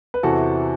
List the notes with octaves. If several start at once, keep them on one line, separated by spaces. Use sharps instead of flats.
B4
E2 C3 E3 F#4 A4